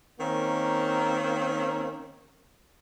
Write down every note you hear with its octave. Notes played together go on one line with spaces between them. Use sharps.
D#3 A#3 C4 C#4